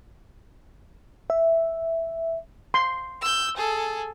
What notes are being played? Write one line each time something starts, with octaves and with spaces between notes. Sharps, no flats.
E5
C6
E6 G6
G#4 A4